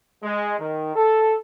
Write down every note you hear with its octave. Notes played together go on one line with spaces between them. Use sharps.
G#3
D#3
A4